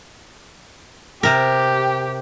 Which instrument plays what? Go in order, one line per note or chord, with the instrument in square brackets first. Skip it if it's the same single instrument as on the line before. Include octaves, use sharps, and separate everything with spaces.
[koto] C3 A#4 [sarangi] G4